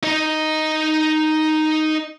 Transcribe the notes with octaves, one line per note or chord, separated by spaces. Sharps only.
D#4 D#5